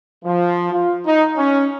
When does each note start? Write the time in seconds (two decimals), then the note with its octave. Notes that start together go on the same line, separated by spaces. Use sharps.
0.24 F3
0.72 F4
1.06 D#4
1.37 C#4